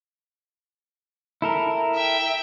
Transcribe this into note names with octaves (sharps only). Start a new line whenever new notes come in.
E4 A4 A#4
E5 G5